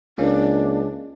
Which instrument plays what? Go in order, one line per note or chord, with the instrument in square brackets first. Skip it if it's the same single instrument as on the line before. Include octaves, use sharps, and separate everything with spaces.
[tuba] C#2 [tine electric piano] A#3 C#4 [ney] D4